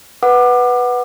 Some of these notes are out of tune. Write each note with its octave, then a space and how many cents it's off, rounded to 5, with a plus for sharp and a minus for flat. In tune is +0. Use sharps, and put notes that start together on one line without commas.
B4 +0 F#5 +0 D6 +30